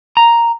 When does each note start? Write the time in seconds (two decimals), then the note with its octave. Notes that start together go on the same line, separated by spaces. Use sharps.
0.17 A#5